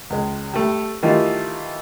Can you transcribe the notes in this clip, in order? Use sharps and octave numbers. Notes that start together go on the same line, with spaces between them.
C#2 G#3
G3 A3
D#3 E3 G3 A3 D#4 F4